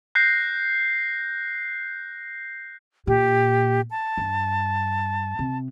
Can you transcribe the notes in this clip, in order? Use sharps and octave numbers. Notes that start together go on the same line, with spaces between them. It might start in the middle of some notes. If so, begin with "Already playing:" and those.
F#6 G6 A#6 C7
A#2 G4
A5
G2
C3